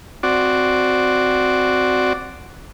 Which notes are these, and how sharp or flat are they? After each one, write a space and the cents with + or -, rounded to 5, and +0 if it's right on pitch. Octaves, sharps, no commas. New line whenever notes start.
C4 -5 F#4 +0 D5 +0